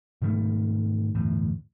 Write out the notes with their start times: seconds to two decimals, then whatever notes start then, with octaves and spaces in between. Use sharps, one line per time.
0.22 G#2 B2 D#3 A3
1.15 G1 E2 A2